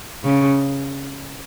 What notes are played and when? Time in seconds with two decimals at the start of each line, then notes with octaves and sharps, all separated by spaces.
0.24 C#3